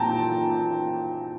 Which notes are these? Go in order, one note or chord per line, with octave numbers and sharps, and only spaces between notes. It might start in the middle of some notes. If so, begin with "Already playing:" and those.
Already playing: A#2 F3 C4 G5 A5 A#5